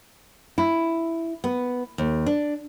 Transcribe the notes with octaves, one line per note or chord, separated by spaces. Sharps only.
E4
B3
D#2
D4